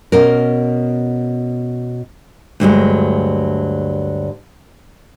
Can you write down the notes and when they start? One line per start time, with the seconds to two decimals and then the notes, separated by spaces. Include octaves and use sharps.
0.12 B2 C#4 A#4
2.60 D2 G2 F#3 G#3